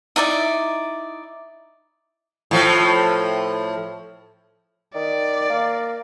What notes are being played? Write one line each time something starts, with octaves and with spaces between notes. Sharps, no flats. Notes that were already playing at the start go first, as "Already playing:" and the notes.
D#4 E4 D5 E5
A2 F3
D#3 D5
A#3